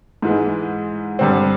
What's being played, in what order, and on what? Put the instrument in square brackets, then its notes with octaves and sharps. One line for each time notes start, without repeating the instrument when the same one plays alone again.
[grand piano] G#2 E3 G#3
G2 D3 G3 C4